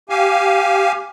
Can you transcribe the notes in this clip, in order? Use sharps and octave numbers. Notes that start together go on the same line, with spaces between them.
G4 F5 G#5